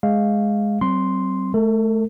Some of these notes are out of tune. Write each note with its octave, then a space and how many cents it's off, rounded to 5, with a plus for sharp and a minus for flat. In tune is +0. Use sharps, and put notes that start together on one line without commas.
G#3 +0 F5 +0
F#3 +45 C4 +0 C6 +0
A3 -25 A4 +45